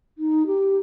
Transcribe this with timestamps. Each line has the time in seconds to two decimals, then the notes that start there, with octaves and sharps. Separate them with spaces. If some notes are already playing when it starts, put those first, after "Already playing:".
0.18 D#4
0.46 G4